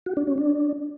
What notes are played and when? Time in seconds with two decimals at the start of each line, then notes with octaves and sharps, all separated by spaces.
0.06 F#4
0.17 D4
0.27 C#4
0.38 D4